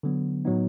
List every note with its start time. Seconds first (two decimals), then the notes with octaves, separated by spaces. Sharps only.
0.03 D3 F#3 B3
0.45 A2 F#3 B3 D#4